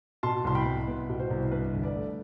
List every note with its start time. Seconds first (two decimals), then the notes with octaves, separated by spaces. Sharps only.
0.23 B2 A5 C6
0.44 C2 C6
0.55 G5 B5
0.65 C2
0.88 B3
1.09 B2
1.19 C5
1.30 C2
1.51 G2 B4
1.73 G1
1.83 B4 D5
1.95 A3